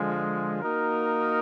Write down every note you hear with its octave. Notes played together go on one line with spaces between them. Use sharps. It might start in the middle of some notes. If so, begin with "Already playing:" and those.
Already playing: D3 F3 G#3
A#3 D#4 F#4 A#4